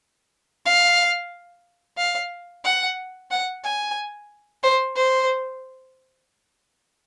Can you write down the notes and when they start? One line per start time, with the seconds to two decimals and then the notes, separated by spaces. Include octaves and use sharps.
0.65 F5
1.97 F5
2.64 F#5
3.31 F#5
3.64 G#5
4.62 C5
4.95 C5